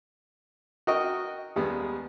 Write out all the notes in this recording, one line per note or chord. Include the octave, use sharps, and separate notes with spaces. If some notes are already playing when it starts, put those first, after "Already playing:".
F#4 A#4 D#5 G5 C#6
D#2 G3 G#3 B3